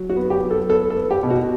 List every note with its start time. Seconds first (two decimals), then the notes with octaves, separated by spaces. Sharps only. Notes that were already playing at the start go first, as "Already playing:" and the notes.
Already playing: F#3
0.09 F#4
0.16 B3
0.30 G4
0.43 F#3
0.51 A4
0.69 B3 A4
0.90 A4
0.97 B3
1.11 G4
1.23 B2
1.30 F#4